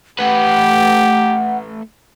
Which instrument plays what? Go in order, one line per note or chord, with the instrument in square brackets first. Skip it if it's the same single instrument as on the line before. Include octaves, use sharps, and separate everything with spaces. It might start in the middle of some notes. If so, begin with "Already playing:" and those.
[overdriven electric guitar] A3 B4 [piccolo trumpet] G4 [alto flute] F#5